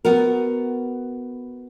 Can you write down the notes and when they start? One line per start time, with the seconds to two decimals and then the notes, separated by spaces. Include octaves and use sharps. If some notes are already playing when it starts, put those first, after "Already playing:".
0.05 B3 F#4 A#4